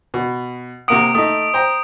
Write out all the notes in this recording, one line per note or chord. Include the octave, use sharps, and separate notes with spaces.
B2
C3 A#3 F#5 D#6 D7
A3 D#4 D#6
C5 G5 A#5